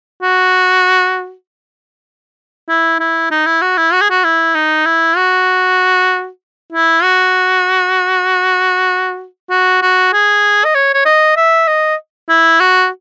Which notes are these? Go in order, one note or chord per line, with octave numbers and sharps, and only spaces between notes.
F#4
E4
E4
D#4
E4
F#4
E4
F#4
G#4
F#4
E4
D#4
E4
F#4
E4
F#4
F#4
F#4
G#4
D#5
C#5
C#5
D#5
E5
D#5
E4
F#4